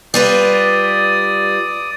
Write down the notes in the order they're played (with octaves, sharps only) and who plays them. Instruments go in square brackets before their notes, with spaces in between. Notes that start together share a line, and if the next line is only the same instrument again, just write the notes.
[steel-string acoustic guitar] G3 F4 B4 [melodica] D5 D#6